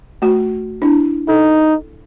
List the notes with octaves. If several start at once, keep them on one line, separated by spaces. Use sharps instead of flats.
A3 F#4
D4 E4
D#4 A4